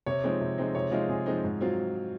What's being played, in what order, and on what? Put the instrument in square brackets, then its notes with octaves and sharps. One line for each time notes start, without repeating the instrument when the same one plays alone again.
[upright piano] C3 [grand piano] C#5
[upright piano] F3 G#3 C4 D#4
C3
F3 G#3 C4 D#4
[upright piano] C3 [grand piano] C#5
[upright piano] F3 G#3 C4 D#4 [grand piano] F4
[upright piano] C3 [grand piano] G#4
[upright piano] F3 G#3 C4 D#4
G#2
F#3 C4 F4